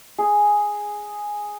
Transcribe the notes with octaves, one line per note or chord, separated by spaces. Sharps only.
G#4